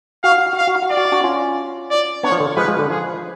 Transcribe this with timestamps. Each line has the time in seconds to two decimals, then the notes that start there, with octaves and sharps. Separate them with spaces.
0.24 F#4 F5
0.38 F#4
0.53 F#4
0.57 F5
0.67 F#4
0.82 F#4
0.90 D5
0.97 F#4
1.12 D4 F#4
1.24 C#4 F4
1.91 D5
2.23 B3 D4 C#5
2.32 F3
2.40 D3
2.57 F3 G#3 B4
2.68 F3 G#3
2.79 D3
2.90 F3 G#4